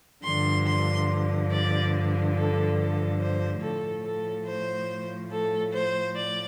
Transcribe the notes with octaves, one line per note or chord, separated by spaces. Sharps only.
G2 D3 F3 C6
C6
D5
A4
A4
C5
A2 F3 A4
A4
C5
A4
C5
D5